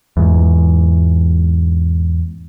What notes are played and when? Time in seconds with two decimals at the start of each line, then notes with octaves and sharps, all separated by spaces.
0.17 E2 G#2